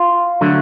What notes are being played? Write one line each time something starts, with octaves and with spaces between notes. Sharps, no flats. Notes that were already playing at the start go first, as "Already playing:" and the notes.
Already playing: F4
D3 F#3 A3